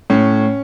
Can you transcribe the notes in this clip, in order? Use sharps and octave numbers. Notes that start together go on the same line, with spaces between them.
A2 C#4